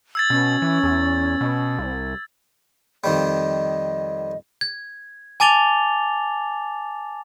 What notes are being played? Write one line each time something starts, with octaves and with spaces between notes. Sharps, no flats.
E6 G#6 A6
B2 C#4
E3
E2
B2
C2
F2 D#3 G3 D#5
G#6
G#5 A5 D6 A6 F7 G7